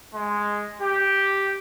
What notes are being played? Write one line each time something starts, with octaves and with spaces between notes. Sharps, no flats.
G#3
G4